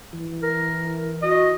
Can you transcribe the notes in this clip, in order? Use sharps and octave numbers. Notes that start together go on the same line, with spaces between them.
E3
A#4
F#4 D#5